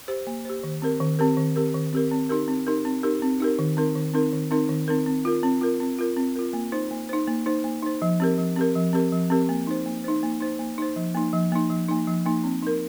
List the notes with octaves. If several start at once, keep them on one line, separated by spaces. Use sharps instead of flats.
G4 C5
A#3
G4 C5
D#3
C4 G4 A#4
D#3
C4 G4 A#4
D#3
C4 G4 A#4
D#3
C4 G4 A#4
C4
D#4 G4 A#4
C4
D#4 G4 A#4
C4
D#4 G4 A#4
C4
D#4 G4 A#4
D#3
C4 D#4 A#4
D#3
C4 D#4 A#4
D#3
C4 D#4 A#4
D#3
C4 D#4 A#4
C4
F4 A#4
C4
F4 A#4
C4
F4 A#4
C4
F4 A#4
A#3
D#4 C5
A#3
D#4 C5
A#3
D#4 C5
A#3
D#4 C5
F3
C4 G4 A#4
F3
C4 G4 A#4
F3
C4 G4 A#4
F3
C4 G4 A#4
A#3
D#4 C5
A#3
D#4 C5
A#3
D#4 C5
A#3
D#4 C5
F3
A#3 D#4
F3
A#3 D#4
F3
A#3 D#4
F3
A#3 D#4
C4
D#4 A#4